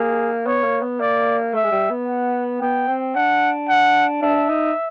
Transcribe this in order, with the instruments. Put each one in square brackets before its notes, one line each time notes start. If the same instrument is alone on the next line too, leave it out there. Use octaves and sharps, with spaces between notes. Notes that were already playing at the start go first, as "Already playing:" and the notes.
Already playing: [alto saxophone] A#3 [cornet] G#4
[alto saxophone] B3 [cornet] C#5
[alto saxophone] A#3
B3
[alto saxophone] A#3 [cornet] D5
[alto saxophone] A3 [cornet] E5
[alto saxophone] G#3
G3
B3
[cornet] F#5
[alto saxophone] B3 [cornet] G5
[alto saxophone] C4
[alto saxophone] D4 [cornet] F#5
[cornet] F#5
[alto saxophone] D4 [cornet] E5
[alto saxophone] D#4